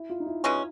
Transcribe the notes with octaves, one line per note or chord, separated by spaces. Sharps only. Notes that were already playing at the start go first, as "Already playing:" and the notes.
Already playing: E4
F4
D#4
E4
B2 G#3 C#4